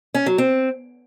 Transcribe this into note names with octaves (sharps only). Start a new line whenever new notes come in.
C#4
F#3
C4